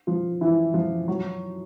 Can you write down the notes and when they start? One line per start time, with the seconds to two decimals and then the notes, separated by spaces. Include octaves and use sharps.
0.07 F3 F4
0.41 E3 E4
0.74 F3 F4
1.08 F#3 F#4